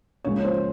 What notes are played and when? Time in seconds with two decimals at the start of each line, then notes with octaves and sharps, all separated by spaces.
0.24 C#2 C#3 F3 A#3 C#4 C#5
0.45 C5